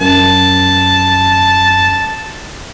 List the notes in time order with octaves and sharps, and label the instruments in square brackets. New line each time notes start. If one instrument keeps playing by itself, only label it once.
[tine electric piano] F#2 [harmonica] A5